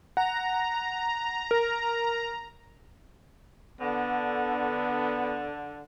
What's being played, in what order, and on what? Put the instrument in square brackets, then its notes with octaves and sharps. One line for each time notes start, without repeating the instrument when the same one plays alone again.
[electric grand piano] F#5 [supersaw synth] A#5
[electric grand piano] A#4
[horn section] D3 [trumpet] B3